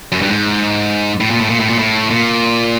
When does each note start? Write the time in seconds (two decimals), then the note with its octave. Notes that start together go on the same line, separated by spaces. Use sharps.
0.12 F#2
0.22 G2
0.31 G#2
1.20 A2
1.31 A#2
1.41 A2
1.50 A#2
1.60 A2
1.69 A#2
1.79 A2
2.11 A#2